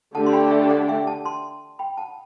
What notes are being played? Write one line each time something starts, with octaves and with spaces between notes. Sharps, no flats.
D3 A3 D4 G4 F#5 A5
C6
G5 B5
E5 G5
D5 F#5
E5 G5
F#5 A5
A5 C6
G5 B5
F#5 A5